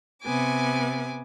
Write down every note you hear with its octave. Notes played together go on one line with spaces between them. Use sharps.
C3 B3 G#5 D6